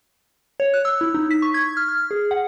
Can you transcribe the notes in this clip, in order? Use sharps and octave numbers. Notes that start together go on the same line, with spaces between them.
C#5
F#6
E6
E4
D#4
B6
C#6
G#6
F6
F6
G#4
F#5